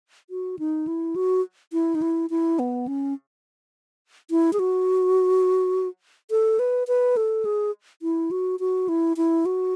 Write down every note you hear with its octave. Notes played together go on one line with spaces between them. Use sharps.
F#4
D#4
E4
F#4
E4
D#4
E4
E4
B3
C#4
E4
G#4
F#4
A4
B4
B4
A4
G#4
E4
F#4
F#4
E4
E4
F#4